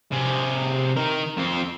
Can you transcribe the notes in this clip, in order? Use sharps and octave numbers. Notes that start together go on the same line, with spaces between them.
C3 G#4
D#3 A#4
F2 C4